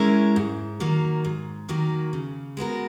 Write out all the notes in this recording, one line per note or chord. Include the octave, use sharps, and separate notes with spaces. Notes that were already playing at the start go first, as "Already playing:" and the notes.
Already playing: G#3 C#4 E4 A#4
G#2
D#3 F#3 A#3
G#2
D#3 F#3 A#3
C#3
G#3 B3 F#4 A#4